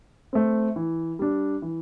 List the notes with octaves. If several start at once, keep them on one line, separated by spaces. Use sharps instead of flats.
A3 C4
E3
G3 D4
E3